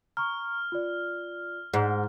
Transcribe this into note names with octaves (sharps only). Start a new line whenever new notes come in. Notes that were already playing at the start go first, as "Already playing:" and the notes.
A#5 C#6 F6
F4 D5
G#2 F#5